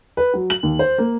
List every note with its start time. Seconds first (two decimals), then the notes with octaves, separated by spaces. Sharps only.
0.17 B4
0.34 F#3
0.50 F#7
0.63 D#2
0.79 C5
0.98 A#3